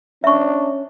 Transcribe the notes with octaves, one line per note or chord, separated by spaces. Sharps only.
C#4 D4 E5 C#6